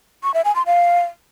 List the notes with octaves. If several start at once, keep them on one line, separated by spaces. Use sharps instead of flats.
C#6
E5
G#5
C6
F5